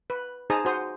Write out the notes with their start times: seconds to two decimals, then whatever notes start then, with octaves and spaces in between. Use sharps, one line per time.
0.10 B4
0.50 D#4 G#4 C5 A5 A#5 D#6
0.65 F#4 C5 D#6